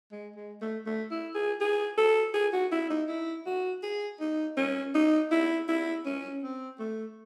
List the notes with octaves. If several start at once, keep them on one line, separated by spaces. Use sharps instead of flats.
G#3
G#3
A3
A3
E4
G#4
G#4
A4
G#4
F#4
E4
D#4
E4
F#4
G#4
D#4
C#4
D#4
E4
E4
C#4
C4
A3